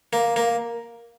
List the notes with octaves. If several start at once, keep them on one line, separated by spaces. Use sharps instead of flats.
A#3
A#3